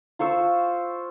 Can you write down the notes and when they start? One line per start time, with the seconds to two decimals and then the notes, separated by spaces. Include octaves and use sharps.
0.19 F4 C5 C#6 E6